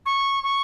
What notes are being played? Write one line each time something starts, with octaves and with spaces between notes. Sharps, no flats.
C#6
C#6